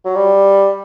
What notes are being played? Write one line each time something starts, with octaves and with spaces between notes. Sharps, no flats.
F#3
G3